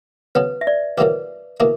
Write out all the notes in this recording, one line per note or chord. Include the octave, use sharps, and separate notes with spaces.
C#3 F#3 B3 B4
E5
D5
A#2 F#3 A#3 E4 G4 B4
B2 A#3 E4 A#4